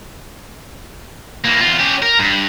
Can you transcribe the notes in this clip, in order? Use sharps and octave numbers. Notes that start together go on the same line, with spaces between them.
E3 A#3
E2 F4
C#4 G4
A#4
G2